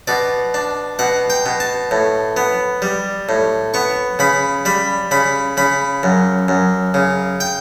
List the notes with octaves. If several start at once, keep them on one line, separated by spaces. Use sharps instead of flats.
B2 D5
D4
B2 F#5
G5
B2
A5
A2
B3
G3
A2
B3 C#6
C#3 B5
G3 B5
C#3 B5
C#3 B5
F#2
F#2
C#3
G5